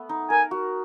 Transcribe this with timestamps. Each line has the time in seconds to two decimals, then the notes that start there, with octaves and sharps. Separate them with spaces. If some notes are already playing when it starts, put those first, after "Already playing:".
Already playing: A3 B3
0.09 D#4
0.30 A#4 G#5
0.51 F#4